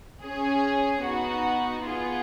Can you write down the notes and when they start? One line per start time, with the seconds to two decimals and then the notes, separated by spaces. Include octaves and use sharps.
0.24 C#4 G#4
1.03 B3 D#4 F#4
1.84 B3 F4 G#4